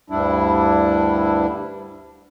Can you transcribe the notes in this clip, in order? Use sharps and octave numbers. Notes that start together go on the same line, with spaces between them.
D2 G2 G3 D4 E4